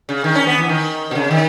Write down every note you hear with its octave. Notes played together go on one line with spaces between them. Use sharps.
C#3
D#3
C#4
B3
E3
D#3
B2
C#3
D#3